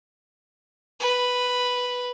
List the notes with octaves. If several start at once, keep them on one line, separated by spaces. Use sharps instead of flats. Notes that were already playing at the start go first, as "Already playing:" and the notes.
B4